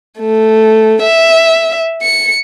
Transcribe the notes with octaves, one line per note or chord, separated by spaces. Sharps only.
A3
E5
C#7